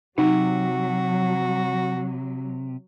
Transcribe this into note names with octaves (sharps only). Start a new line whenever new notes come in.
C3 F#3 D#4 F#4